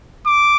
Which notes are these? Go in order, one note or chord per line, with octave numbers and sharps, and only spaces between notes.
D6